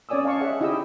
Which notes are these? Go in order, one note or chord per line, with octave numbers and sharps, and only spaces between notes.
C#4 C#5 D5 G#5 D#6 E6
D#5 F5 A5 C#6
G#4 C#5 D#5 E5 F#5 G5
D#4 E4 G4 D#5 G5 E6